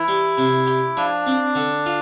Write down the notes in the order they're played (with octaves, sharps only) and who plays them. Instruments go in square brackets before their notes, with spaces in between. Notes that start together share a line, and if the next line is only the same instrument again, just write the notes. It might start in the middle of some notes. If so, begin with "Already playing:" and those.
Already playing: [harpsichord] E3 [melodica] E4
[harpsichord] G3
C3
G4
[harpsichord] F3 [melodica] D4
[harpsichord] C4
D3
F4